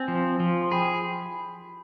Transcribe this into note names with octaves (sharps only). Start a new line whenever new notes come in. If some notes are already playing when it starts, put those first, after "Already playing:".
Already playing: C4 G#5
F3
F3
C6
G#4 G5 B5